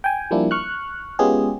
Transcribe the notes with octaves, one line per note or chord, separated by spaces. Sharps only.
G5 G#5
F3 G3 A#3 D4 E4
C#6 F6 F#6
G#3 B3 C#4 F4 G4 G#4